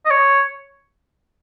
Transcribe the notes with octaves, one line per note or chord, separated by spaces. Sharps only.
D#5
C#5